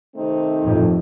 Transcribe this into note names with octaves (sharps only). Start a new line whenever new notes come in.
C3 D#3 A3 C4 D#4
F2 A2